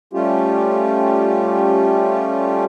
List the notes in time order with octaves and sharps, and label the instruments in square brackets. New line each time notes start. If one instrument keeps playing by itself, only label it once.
[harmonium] G3 A3 C#4 F4 G4